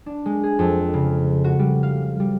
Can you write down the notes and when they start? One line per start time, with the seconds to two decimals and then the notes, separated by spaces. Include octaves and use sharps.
0.06 D4
0.26 G#3
0.43 G#4
0.59 F2
0.94 C#3
1.44 F#4
1.59 G3
1.83 F5
2.20 G3